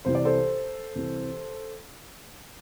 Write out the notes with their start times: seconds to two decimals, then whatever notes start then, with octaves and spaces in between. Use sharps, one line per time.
0.05 C2 C3 E3 C5
0.15 D5
0.25 A4 C5
0.96 C2 C3 E3